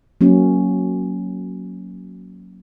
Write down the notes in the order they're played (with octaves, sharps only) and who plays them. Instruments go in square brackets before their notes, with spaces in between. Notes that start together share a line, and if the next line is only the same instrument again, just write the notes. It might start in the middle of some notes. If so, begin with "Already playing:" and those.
[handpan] F#3 A#3 C#4 F#4